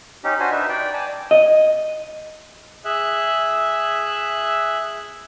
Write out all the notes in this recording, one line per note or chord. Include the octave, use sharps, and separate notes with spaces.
C#4 D#4 G4
D4 F#4 C5 G#5
D#4 B4 E5
D5 G5
D5 G#5 A5
D#5
G#4 E5 F#6